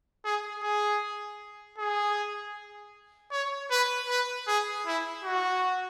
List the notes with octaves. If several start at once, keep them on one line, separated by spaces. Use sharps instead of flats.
G#4
G#4
G#4
C#5
B4
B4
G#4
E4
F#4